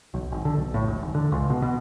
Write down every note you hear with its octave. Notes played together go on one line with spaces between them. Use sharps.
B1
G#1
D3
B1
A2
E1
G#1
D3
C#2
B2
B2